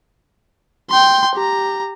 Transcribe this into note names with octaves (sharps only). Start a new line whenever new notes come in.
G5 C6
G4 A#5